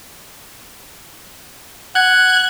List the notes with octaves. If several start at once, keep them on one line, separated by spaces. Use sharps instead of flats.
F#5 F#6 G#6